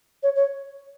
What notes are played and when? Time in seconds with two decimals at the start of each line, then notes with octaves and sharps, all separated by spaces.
0.23 C#5
0.35 C#5